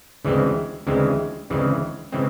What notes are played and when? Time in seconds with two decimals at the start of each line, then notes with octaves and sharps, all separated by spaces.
0.25 D2 C#3 E3 G#3 C4
0.87 D2 C#3 E3 G#3 C4
1.50 D2 C#3 E3 G#3 C4
2.12 C#3 E3 G#3 C4